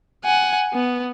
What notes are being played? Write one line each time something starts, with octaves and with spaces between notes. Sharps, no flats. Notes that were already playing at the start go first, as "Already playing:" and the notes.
F#5 G#5
B3